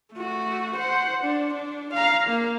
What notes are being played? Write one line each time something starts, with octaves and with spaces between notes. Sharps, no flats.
A3 F#4
C5 F#5
D4
D4
F5 A#5
A#3